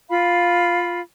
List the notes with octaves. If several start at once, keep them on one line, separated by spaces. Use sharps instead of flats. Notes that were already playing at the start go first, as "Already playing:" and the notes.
F4 F5 B5